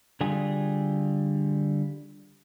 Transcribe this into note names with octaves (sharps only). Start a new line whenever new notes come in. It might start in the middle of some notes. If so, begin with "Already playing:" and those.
D3 G3 F4 G#4